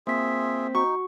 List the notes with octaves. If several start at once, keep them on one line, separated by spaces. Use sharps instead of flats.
A#3 C4 F4 G#4 E5 B6
D#4 F#4 C#6